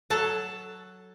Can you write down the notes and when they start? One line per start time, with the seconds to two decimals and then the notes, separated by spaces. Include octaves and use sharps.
0.10 F#3 A4 A5